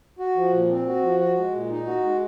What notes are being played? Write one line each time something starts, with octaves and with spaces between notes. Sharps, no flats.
F#4
F3
A#2
C4
F#4
F3
F#4
G#3
A#2
D#4
F#4
G#3